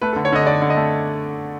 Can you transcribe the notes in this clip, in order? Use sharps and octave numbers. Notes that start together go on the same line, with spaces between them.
A3 B4
A4
D3
C#5
D3 D#5
D3 D5
D3
D#5
A3